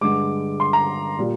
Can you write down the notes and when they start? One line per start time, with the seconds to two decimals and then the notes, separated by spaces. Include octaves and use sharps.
0.01 G2 D3 G#3 D6
0.60 C6
0.73 A#5
1.19 A#2 G3